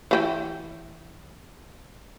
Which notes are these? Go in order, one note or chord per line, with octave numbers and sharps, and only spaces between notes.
E3 F#4 G5